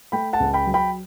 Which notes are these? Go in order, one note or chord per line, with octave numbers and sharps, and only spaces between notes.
A3 G5 B5
F#5 A5
C#2
G5 B5
F#3
G5 B5